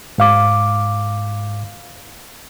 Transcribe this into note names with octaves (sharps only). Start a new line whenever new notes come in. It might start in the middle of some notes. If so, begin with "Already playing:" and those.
G#2 F5 D6